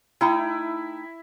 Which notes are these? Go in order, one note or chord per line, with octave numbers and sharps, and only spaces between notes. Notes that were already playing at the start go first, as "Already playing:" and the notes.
A3 D#4 E4 G5